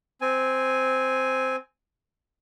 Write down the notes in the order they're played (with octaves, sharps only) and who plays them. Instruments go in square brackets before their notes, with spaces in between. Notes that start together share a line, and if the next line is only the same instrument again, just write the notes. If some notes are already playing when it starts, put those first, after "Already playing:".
[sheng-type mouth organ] C4 G#5